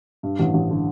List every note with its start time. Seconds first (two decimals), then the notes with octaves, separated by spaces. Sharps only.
0.23 G2
0.39 A1
0.54 A1
0.70 D3